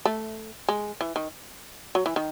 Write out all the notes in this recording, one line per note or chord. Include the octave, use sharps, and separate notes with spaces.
A3
G#3
E3
D#3
F#3
E3
D#3